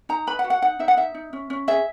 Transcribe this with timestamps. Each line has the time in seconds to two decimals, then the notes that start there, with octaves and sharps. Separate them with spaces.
0.09 D#4 A#5
0.27 B4 B5
0.39 F#5
0.44 F#4
0.50 F#5
0.62 D#4 F#5
0.79 D#4 E5
0.88 F#5
0.97 D#4 E5
1.15 D#4
1.33 C#4
1.50 C#4
1.68 G#4 E5